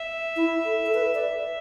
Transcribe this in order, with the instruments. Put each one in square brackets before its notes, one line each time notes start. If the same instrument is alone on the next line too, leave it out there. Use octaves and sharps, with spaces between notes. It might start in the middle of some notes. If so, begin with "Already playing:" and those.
Already playing: [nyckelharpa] E5
[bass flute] E4
A4
A4
B4
D5